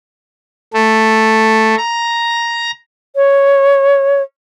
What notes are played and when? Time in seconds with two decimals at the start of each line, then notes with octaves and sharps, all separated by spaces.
0.74 A3
1.78 A#5
3.16 C#5